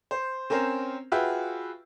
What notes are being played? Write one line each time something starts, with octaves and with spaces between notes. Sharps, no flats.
C5
C4 C#4 A#4 C5
F4 F#4 G#4 B4 E5 G5